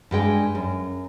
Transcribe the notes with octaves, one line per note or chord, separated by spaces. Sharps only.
G2 G#3 G5
F#2